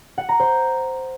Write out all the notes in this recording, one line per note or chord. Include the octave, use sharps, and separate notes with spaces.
F#5
A#5
C5